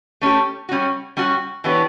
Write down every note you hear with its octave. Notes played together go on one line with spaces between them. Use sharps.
A3 C#4 G4
G3 C#4 F#4
G3 C#4 F#4
E3 B3 D4 G4 C#5